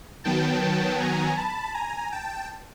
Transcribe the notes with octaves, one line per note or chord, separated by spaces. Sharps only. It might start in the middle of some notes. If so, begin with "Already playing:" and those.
D#3 F#3 B3 G5 A5
G5 A5
G#5 A#5
A5 B5
G#5 A#5
G5 A5